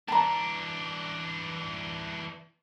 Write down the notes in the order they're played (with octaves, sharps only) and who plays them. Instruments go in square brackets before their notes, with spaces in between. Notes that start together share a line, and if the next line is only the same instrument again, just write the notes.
[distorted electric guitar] E3 D4 [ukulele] A5 A#5